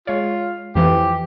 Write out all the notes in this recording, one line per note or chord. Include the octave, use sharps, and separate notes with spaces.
G#3 F4 C#5
F2 E3 F3 G4